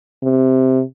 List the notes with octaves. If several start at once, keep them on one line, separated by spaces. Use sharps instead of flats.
C3